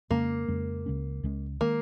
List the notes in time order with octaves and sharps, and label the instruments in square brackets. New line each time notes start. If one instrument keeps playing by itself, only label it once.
[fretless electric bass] F2 C#3 G#3 C#4 [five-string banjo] A#3
[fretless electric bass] F2 C#3 G#3 C#4
C#2 C#3 G#3 C#4
C#2 C#3 G#3 C#4
[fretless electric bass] D#3 G#3 [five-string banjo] A#3